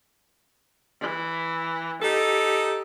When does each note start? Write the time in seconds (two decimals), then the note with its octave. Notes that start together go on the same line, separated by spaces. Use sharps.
1.00 E3
2.02 D#4 G4 A4